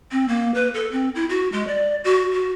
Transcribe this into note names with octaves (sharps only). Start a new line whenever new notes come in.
C4
A#3
B4
A4
C4
E4
F#4
G#3
D5
F#4
F#4